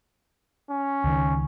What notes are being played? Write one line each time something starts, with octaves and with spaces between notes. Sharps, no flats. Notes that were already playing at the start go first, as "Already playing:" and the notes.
C#4
C#2 D#3